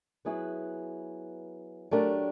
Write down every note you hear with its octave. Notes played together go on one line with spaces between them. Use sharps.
F#3 B3 E4 G#4 B4
F#3 A3 D4 G4 A#4